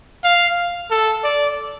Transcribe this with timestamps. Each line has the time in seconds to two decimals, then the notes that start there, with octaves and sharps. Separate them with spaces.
0.24 F5
0.91 A4
1.24 D5